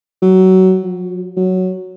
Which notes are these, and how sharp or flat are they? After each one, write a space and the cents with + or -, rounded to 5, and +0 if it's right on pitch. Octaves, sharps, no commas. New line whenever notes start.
F#3 +20
F#3 -45
F#3 +5